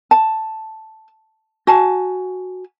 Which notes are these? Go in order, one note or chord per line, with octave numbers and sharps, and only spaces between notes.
A5
F#4 G#5 A5